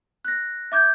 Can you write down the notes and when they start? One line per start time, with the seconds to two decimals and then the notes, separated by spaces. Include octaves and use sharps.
0.25 F#6 A#6
0.72 E5 D6 G6 G#6